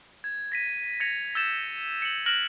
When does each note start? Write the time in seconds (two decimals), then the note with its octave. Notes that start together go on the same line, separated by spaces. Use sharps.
0.24 G#6
0.52 A#6 B6 D#7
1.00 G#6 A#6 C#7 F7
1.35 E6 G6 A6 E7
2.02 C#7 F#7
2.26 F6 F#6 A#6 D7 E7 F#7